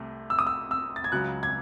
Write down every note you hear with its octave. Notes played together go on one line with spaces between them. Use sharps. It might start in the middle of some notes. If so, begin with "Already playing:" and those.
Already playing: C2 C3 A3
E6
D#6
E6
E6
A6
G#6
C#2 C#3 F#3 F#6
G#6